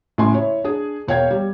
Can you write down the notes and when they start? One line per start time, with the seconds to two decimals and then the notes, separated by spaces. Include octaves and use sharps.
0.18 A2 C#3 A3 G#5 C6
0.33 E4 C#5
0.64 D4 G#4
1.07 E1 C#5 F5 G5 G#6
1.31 G3